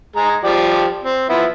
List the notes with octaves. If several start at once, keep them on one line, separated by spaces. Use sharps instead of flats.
G#3 G#4 A#5
F3 G4 D5
C4
F3 B3 E4